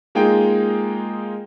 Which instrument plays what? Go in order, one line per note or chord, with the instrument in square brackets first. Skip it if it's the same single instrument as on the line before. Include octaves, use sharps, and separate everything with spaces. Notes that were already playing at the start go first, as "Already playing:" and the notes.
[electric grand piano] G#3 A#3 D#4 F4 G#4 G5